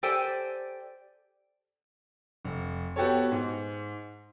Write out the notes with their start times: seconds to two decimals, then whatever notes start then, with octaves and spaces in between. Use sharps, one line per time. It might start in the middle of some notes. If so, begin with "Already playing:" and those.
0.03 G4 A4 C5 D5 G5 G#5
2.45 F1
2.96 B3 F#4 G4 A4 C#5
3.32 G#2